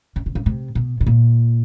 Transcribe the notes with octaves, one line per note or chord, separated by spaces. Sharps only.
C#3
C3
C#3
C3
B2
B2
A#2